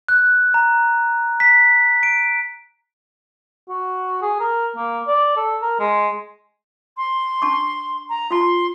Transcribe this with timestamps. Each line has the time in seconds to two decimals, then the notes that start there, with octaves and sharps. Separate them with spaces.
0.08 F#6
0.54 A#5
1.40 B6
2.03 D7
3.69 F#4
4.22 G#4
4.40 A#4
4.76 A#3
5.08 D5
5.37 A4
5.62 A#4
5.80 G#3
6.97 C6
7.42 D4 A5 C#6
8.09 A#5
8.31 F4 A5 C6